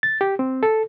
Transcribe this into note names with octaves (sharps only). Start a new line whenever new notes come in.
A6
G4
C4
A4